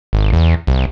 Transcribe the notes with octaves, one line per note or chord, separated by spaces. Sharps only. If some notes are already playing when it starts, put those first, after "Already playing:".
G#1
E2
C2